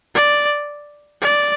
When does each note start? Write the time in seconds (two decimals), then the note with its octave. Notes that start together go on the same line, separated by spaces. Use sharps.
0.15 D5
1.22 D5